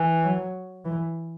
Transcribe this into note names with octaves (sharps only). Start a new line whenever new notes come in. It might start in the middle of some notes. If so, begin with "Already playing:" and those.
Already playing: E3
F#3
E3